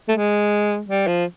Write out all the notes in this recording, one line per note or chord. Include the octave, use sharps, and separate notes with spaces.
A3
G#3
G3
F3